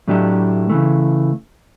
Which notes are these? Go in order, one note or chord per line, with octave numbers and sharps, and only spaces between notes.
A2 F#3 A3 D4 G4
C#3 E3 A3